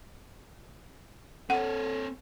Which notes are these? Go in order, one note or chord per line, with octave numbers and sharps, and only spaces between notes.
C4 A4 C#5 F#5